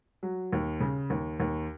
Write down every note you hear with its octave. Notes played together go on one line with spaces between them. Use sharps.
F#3
D#2
C#3
D#2
D#2